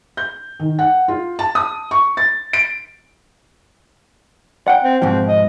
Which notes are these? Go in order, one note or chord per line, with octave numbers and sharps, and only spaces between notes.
G6
D#3
F#5
F4
A5
D#6
C#6
A6
D7
F#5 G5
C4
G#2 B2 F3 C4
D#5